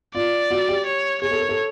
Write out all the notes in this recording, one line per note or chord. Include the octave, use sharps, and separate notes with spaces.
F4 D5
F#4
G4
C#5
G#4 C#5
A4
A#4
A4